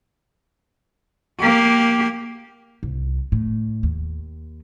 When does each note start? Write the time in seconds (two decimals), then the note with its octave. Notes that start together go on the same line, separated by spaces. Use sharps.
1.40 A#3 G4
2.83 C2
3.32 A2
3.83 D#2